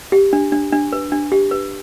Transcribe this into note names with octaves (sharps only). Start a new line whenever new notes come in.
G4
D4
D4
D4
B4
D4
G4
B4